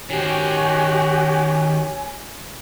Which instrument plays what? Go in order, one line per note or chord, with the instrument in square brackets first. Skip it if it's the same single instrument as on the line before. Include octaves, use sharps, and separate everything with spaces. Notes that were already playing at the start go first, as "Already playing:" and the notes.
[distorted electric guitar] D#3 C5 [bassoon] C#4 [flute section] F#4 G4 [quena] G#5